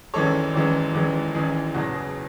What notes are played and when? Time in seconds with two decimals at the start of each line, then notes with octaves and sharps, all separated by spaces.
0.14 G#1 F#2 E3 G#3 A4 C#5
0.54 G#1 F#2 E3 G#3
0.94 G#1 F#2 E3 G#3
1.34 G#1 F#2 E3 G#3 G#4
1.74 F#1 E2 B2 F#3 F#4
1.94 G#4